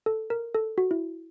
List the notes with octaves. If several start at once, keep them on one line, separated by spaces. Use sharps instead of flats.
A4
A#4
A4
F#4
E4